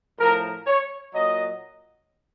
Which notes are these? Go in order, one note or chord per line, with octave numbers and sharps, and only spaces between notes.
A2 F3 A#4
C#5
A#2 F#3 D#5